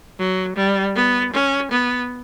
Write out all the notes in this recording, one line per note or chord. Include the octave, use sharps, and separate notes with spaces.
F#3
G3
B3
C#4
B3